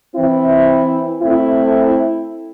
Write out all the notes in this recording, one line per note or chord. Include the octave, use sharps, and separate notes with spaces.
E3 C4 E4
A3 C4 E4